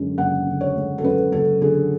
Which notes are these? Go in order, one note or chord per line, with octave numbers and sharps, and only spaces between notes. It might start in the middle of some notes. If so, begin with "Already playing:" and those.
Already playing: F#2 D3 G#3
F#1 F#5
D3
C#5
G#3
A4
F#2 B4
F#1 A4
D3 G#4